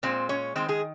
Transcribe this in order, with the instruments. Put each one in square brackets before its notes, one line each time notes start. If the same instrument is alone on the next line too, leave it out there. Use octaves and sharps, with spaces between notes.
[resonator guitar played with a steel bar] A#2 G#3 C4 C5
C#4 C#5
D#3 G#3 C4 C5
G#3 G#4